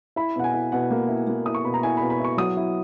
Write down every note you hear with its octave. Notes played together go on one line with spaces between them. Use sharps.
E4 B5
B2 F#5
G#5
E4
B2 F#5
A#3
E4
A#3
E4 D#6
C#6
B2 B5
A#5
E4 G#5
B5
B2
B5
E4 C#6
F#3 D#6
E4